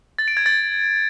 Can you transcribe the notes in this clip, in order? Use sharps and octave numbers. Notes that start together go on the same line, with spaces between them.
A6
D7
G#6
A6